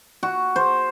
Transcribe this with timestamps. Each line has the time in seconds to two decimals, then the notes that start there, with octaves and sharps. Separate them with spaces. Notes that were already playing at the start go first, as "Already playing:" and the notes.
0.23 F#4
0.56 C5